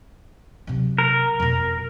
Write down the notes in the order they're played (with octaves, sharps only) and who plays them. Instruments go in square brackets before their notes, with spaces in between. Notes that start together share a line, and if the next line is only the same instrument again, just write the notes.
[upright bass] C3 F#3
[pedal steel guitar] A#4
[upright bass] F2 B2